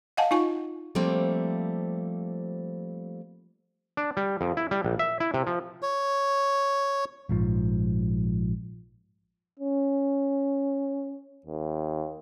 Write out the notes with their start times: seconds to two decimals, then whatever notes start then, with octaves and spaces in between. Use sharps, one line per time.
0.17 D#5 F5 F#5 G#5 A5
0.31 D#4 F4 G#5 C#6
0.95 F3 G3 A3 A#3 C4
3.97 D4
4.17 G3
4.41 F2
4.57 E4
4.71 G3
4.84 A#1
4.99 E5
5.20 E4
5.34 C3
5.47 F3
5.82 C#5
7.29 A#1 G#2 F3
9.60 C#4
11.46 D#2